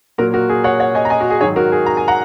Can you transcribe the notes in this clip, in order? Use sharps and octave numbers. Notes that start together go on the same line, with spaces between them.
A#2 F#3 A#3 F#4 A#4
F#4 A#4
G#4
C#5 F#5
C#5 F#5
D#5 G#5
A#5
D#5 G#5
F#4
G#4
G#2 D#3 F#3 G#4 C#5
F#4 A#4
G#4
A#5
G#5
F#5 A#5